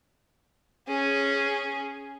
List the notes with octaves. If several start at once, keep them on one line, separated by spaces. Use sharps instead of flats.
C#4 G#4